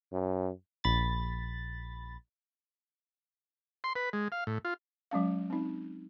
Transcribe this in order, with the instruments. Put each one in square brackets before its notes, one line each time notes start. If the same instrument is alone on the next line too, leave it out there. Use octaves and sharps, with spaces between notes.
[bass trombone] F#2
[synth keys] A#1 B5 A6
[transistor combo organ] C6
B4
G#3
F5
A2
F4
[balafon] F#3 G#3 C#4 F5
C4 D#4